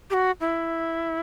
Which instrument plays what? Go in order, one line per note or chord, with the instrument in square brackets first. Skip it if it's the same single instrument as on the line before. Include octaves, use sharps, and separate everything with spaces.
[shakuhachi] G4
F#4
E4